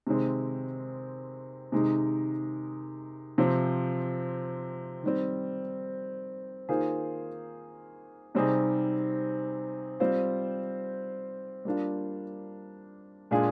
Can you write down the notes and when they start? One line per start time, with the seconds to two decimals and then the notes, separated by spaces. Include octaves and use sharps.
0.07 C3 D#3 G#3 C4
1.72 C3 D#3 G#3 D#4
3.38 C3 F3 C4
5.03 D#3 G3 C4
6.69 D#3 A#3 F4 G#4 C5
8.35 C3 G3 C4 D#4 G#4
10.00 G3 C4 F4 C5
11.65 G3 A#3 D4 F4
13.31 A#2 G#3 D4 F4 G#4